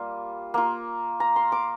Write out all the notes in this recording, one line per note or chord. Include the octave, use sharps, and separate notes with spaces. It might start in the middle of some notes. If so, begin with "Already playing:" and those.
Already playing: G3 A#3 F4
A#3 F4
A#5
C6
D6